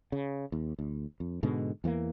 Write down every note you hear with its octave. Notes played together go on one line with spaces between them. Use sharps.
C#3
D#2
D2
F2
G#2 B2 D3 G#3
E2 E3 A3 A#3